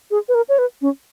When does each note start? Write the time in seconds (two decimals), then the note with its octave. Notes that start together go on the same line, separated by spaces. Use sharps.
0.11 G#4
0.28 B4
0.34 A#4
0.49 C#5
0.58 B4
0.81 C#4